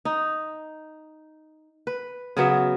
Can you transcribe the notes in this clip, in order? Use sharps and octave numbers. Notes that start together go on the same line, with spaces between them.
D#4
B4
C#3 F#3 B3 E5